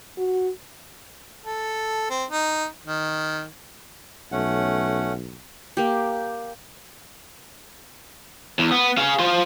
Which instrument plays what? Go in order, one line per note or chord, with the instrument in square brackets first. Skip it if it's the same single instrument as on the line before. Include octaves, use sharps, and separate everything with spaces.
[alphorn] F#4
[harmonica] A4
C4
D#4
D#3
[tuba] B1 [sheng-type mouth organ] A3 C#4 F#5
[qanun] A#3 G4
[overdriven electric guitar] E2
B3
G#4 F5
F4 C5